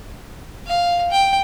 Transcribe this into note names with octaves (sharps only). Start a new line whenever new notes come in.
F5
G5